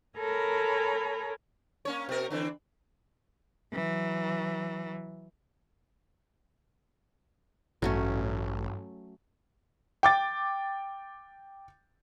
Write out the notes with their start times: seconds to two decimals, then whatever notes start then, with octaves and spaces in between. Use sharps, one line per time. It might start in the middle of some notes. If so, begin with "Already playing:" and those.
0.16 A4 A#4 C#5 G#5 A#5 B5
1.85 A#3 C#4 C#5
2.09 B2 A#4
2.30 D3 E3 C4
3.74 E3 F#3
7.82 A1 G2 F#3 A3 C#4
10.03 G5 D6 A6